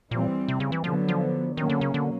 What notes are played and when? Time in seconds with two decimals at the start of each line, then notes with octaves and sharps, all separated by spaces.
0.11 A#2 E3 G3 C4
0.48 C3
0.60 C#3
0.72 E3
0.84 D3 F3 F#3 B3
1.08 F3
1.57 B2 D#3 F#3 A#3 C#4
1.70 D3
1.81 C#3
1.94 D3